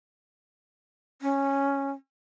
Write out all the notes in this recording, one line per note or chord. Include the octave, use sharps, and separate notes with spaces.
C#4